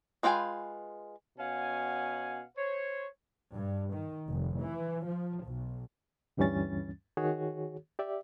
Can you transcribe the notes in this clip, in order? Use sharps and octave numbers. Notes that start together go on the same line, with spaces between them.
G#3 F4 B4 G5 G#5
B2 C#4 F5 F#5 G#5
C5 C#5
G2
D#3
F1
E3
F3
B1
D2 G2 E3 G3 C#4 A6
D#3 F#4 G#4 C#5
G4 D5 E5